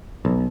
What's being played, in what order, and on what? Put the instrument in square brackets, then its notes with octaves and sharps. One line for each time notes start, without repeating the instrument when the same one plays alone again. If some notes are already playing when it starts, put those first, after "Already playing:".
[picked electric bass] B1